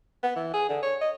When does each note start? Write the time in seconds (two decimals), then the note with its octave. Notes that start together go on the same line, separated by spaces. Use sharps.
0.23 B3
0.36 E3
0.53 G#4
0.69 D3
0.83 C#5
1.01 D#5